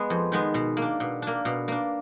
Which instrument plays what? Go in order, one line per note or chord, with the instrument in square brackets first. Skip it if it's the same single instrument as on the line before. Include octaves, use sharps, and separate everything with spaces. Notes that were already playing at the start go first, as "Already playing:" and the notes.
Already playing: [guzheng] G#3 B3
F2
D#3 G#3 B3
B2
A#3
D4
B2
A#3 D4
B2
A#3 D4